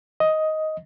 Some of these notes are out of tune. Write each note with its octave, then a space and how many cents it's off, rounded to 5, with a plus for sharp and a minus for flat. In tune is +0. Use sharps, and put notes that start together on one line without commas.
D#5 +10